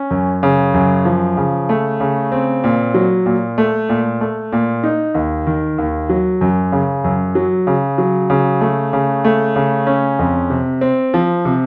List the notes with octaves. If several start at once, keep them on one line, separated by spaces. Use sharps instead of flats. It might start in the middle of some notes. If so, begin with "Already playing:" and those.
Already playing: C#4
F#2
C#3
F#2
F3
C#3
A3
C#3
C4
A#2
F#3
A#2
A3
A#2
A3
A#2
D#4
D#2
D#3
D#2
F#3
F#2
C#3
F#2
F#3
C#3
F#3
C#3
A3
C#3
A3
C#3
C#4
F2
C3
C4
F3
C3